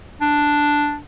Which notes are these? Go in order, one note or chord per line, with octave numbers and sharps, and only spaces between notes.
D4